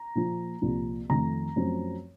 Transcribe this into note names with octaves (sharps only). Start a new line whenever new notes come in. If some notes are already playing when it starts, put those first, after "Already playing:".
Already playing: A#5
A#2 F3 A#3
C2 A#2 F3
F2 D#3 A3 A#5
F#2 F3 A3 C4